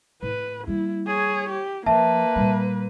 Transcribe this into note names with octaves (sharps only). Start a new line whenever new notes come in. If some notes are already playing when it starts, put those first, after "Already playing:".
A2 B4
G3 A#3 E4
G#4 C#5
G4
F3 A#3 B4 E5 A5
A#2 G3